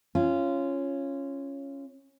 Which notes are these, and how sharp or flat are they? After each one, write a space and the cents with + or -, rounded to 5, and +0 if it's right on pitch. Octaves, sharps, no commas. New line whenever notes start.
C#4 -5 F4 -20